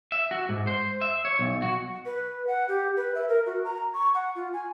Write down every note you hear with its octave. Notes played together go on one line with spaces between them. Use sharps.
E5
F#4
G#2
C5
E5
C#5
B1
F#4
B4
F#5
G4
B4
E5
A#4
F#4
A#5
C#6
F#5
F4
G#5